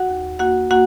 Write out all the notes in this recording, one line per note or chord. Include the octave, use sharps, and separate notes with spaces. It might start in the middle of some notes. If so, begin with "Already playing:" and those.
Already playing: F#4 F#5
D#2
A#3 F#4 F#5
A#3 F#4 F#5